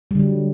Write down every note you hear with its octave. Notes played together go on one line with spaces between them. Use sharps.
D3 F#3 G3